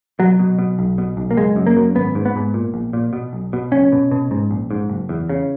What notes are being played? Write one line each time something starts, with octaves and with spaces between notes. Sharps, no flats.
B2 F#3
B2
B2
B1
B2
B1
A#3
F#1 G#3
F#2
A#3
F#2
G#1 B3
G#2
B3
G#2
A#2
A#1
A#2
B2
B1
B2
F#1 C#4
B2
B2
G#2
A#1
G#2
F#1
E2
C#3